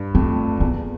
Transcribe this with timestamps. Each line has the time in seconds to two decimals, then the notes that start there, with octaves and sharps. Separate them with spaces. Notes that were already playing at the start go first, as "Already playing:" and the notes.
Already playing: G2
0.15 F2 A3
0.60 E2 A#3